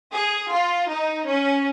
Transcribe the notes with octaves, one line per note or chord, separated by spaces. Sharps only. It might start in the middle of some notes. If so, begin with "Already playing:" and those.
G#4
F4
D#4
C#4